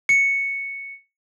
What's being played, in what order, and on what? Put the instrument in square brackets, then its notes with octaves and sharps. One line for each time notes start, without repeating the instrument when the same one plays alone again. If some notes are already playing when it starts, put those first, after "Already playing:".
[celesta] C#7